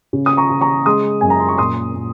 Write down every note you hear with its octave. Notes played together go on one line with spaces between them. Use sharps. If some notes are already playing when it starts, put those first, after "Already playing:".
C#3
D#6
A#5 C#6
C#3
A#5 C#6
G#3 C6 D#6
F#2 G#5
A#5
C6
C#6
A#2 C6 D#6
A#2